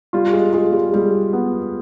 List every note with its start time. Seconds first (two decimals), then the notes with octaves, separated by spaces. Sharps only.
0.13 G3 F4
0.33 G#3
0.53 G#3 F4
0.72 G3
0.93 G3 G#3
1.33 B3